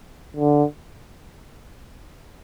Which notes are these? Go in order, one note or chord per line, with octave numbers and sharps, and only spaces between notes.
D3